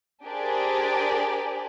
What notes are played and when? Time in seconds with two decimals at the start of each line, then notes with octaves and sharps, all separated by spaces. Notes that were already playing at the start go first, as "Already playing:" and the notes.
0.25 D4 G4 G#4 A#4 C5 D5